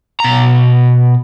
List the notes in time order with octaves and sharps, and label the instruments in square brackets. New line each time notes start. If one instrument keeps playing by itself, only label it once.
[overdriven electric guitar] B2 A#5